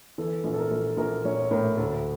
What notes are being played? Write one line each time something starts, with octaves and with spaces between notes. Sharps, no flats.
E3 A4
A#1
A4
A#4
A#1
A#1 A#4
A#1 C#5
C#5
A2 A#4
D2 A4